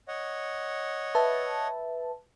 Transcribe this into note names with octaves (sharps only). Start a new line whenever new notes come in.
C#5 D#5 F#5
B4 E5 A5